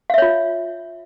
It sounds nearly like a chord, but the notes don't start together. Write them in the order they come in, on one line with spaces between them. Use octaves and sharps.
F5 E5 C#5 F4